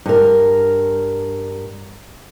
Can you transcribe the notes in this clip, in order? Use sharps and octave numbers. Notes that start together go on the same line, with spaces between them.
G2 A#4